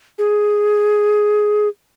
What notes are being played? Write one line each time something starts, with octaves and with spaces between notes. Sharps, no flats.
G#4